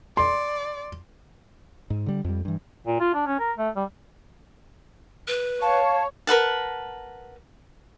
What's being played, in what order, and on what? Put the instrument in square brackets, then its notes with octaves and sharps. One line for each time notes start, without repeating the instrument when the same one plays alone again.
[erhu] D5 [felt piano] C6
[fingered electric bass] G#2
D3 G3
F2 G3
G2 E3
[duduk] A#2
F4
D4
C#4
A#4
A3
G3
[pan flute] B4
[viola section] C#5 [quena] F5 [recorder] A5
[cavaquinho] A#4 B4 F#5 A5